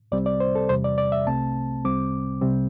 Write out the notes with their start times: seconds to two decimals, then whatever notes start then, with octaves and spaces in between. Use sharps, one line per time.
0.12 C2 C3 G3 C4 D5
0.26 D5
0.40 C5
0.55 A4
0.69 E2 C3 G3 C5
0.84 D5
0.98 D5
1.12 E5
1.26 C2 C3 A3 C4 A5
1.85 C2 C3 G3 C4 D6
2.41 C2 C3 G3 C4